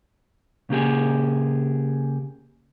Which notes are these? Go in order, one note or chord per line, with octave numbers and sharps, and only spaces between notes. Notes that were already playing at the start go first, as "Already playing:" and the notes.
C#3 A#3 G4 G#4